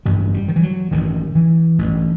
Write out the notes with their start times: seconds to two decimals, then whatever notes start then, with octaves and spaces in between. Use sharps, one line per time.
0.06 A1 G2 G3
0.34 G3
0.48 D#3
0.56 E3
0.63 F#3
0.91 A1 G2 D#3
1.35 E3
1.79 A1 G2